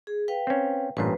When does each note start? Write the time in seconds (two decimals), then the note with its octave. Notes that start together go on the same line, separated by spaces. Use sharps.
0.07 G#4
0.28 B4 F5 G5
0.47 C4 C#4
0.97 A1 G2 A#2 B4 C5